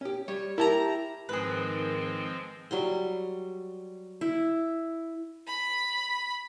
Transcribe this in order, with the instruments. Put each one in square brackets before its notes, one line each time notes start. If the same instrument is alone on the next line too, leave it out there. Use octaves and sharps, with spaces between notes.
[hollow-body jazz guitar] C#4 G4
[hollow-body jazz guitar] G3 [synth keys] C#5
[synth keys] E4 G4 A#5 [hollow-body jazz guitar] A#4 E5 A5
[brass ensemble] G#2 D#3 [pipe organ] F3 G#3 C4 [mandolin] G#4 B4
[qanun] F#3 G3 C6
E4
[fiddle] B5